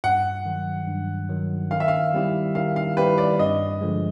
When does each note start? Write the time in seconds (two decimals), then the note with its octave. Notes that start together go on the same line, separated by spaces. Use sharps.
0.04 G2 F#5
0.46 D#3 F#3
0.87 G2
1.29 D#3 F#3
1.71 D#3 F5
1.80 E5
1.88 F5
2.14 G3 C4 E4 G4
2.55 D#3 F5
2.76 F5
2.97 G3 C4 E4 G4 B4
3.18 D5
3.39 G2 D#5
3.81 D3 F3 G#3